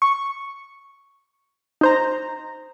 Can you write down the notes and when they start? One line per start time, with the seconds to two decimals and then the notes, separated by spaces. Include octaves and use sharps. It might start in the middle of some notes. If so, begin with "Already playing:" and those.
0.02 C#6
1.81 D#4 C5 A#5